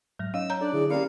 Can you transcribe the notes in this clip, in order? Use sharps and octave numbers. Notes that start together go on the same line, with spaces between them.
G#2 F#3 F6 A#6
C#4 D#4 D#5 F5 E6
C#5 A#5 G6
D4 A4 D5 F#6
D3 E4 G#4
A#3 C4 C#4 G4 D5 F5